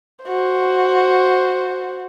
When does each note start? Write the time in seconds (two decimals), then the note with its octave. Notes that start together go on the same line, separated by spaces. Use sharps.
0.25 F#4 C5